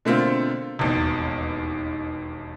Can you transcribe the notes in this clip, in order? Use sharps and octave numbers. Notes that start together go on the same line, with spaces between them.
B2 D3 A3 A#3 C4 F4
E1 A1 D#2 B2